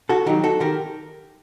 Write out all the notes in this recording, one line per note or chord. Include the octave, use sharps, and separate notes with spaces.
F#4 A4
D#3 F#3 D#4 G4
F#4 A4
D#3 G4 A#4